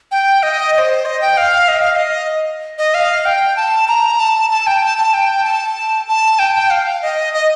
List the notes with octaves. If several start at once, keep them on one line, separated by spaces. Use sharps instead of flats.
G5
D#5
D#5
C5
D#5
G5
F5
D#5
F5
F5
D#5
D#5
F5
G5
A5
A#5
A5
A5
G5
A5
A5
G5
A5
A5
G5
G5
F5
D#5
D#5